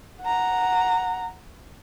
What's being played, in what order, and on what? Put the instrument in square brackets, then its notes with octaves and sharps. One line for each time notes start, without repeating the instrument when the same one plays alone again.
[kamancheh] F#5 A#5